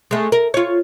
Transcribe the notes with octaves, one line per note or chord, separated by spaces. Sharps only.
G#3 A3
A#4
F4 C#5